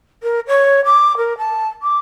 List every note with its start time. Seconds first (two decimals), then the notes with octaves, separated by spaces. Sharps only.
0.23 A#4
0.47 C#5
0.85 D6
1.17 A#4
1.38 A5
1.82 D6